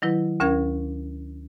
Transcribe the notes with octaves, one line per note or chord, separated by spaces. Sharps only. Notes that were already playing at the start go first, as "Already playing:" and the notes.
D#3 F#3 E4 B4
D2 C#4 A#4 F5 G#6